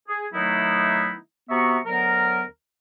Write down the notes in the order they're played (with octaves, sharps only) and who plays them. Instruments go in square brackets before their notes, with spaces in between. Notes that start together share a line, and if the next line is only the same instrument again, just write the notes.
[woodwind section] G#4
D#3 F#3 A3 B3 D#4 E4
C3 B3 F#4 E5 A#5 C#6
D2 F#3 B3 A#4